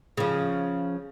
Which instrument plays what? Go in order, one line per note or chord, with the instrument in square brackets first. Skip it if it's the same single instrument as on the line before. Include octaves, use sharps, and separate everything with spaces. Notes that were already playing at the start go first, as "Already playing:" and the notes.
[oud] C#3 F3